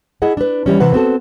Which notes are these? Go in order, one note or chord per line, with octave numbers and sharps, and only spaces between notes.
E4 G#4 D#5 F#5
D4 B4
E3 G3 C#4
C3 E3 B4 F#5
B3 C4 F#4 A4